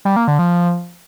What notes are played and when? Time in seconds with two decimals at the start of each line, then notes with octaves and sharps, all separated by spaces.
0.05 G3
0.16 A#3
0.28 D3
0.39 F3